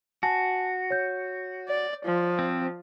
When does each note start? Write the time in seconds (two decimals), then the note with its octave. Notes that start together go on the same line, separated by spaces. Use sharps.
0.23 F#4 G#5 A5
0.90 C#5 G6
1.68 D5
2.05 F3
2.39 C4